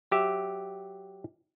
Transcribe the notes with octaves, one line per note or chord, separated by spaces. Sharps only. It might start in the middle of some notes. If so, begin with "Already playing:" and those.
F#3 G4 E5